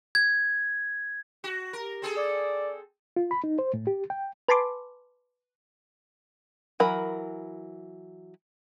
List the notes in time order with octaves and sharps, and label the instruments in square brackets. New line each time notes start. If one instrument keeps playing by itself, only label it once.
[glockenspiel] G#6
[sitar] F#4
[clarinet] G4 [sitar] A#4
[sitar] C4 G#4 A4
[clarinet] D5
[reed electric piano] F4
B5
D#4
C5
A2
G4
G5
[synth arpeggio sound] B4 G#5 A5 B5 C6 D6
[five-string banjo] E3 F#3 A#4 B5